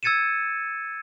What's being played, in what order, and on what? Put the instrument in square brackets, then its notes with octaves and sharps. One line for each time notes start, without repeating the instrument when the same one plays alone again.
[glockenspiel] E6 G#6 A6 C#7 D#7 E7